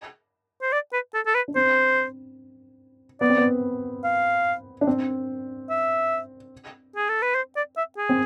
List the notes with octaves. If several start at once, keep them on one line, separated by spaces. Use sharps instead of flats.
C5
D5
B4
A4
A4
B4
D4
C4 C5
B3 D5
C4
B3
F5
D4
C4
E5
G#4
A4
B4
C5
D5
E5
G#4
C4